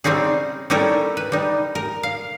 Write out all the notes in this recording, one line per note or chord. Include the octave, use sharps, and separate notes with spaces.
G3 C4 C#4 D#4 G#4
G3 C#4 D#4 E4 A4 A#4
B4
G3 D#4
A#4
F5